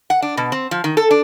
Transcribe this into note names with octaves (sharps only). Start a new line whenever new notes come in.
F#5
D4
B2
C4
F3
D#3
A4
D4